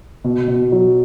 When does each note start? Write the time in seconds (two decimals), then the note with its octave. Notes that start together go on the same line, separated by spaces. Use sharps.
0.24 B2
0.48 B2
0.72 F#3